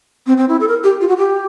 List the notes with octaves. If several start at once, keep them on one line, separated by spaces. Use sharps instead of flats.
C4
C4
E4
A4
A#4
G4
F4
F#4
G4